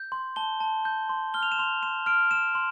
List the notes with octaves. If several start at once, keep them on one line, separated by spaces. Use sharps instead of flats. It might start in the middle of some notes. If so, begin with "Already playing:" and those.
Already playing: G6
C6
A5 G7
A5
G6
C6
F6 G7
F7
E7
C6 F7
C6 E7
F6 D7
F6 E7
C6